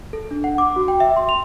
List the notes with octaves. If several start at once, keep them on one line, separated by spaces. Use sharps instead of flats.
A4
D4
F#5
D6
F#4
G5
E5
C6
F7